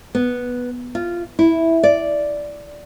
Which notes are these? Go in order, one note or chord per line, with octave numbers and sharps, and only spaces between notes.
B3
F4
E4
D5